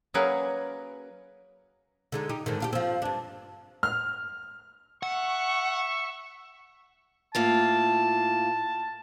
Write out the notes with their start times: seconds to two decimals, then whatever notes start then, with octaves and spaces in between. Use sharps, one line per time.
0.14 F#3 A#3 C#4 G#4 A#4 B4
2.12 D3 G#3 D#4
2.29 D#4 G4
2.46 G#2 D3 D#3
2.60 D4 F4 G4
2.73 F3 C4
3.02 G2 D4
3.83 F6
5.03 E5 F#5 C#6
7.35 A2 A#3 F4 A5